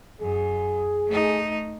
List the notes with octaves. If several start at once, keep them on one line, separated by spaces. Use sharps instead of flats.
F#2 G#4
A3 D#4